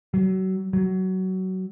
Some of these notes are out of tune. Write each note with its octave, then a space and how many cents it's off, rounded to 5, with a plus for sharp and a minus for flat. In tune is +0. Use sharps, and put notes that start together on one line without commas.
F#3 +30
F#3 +20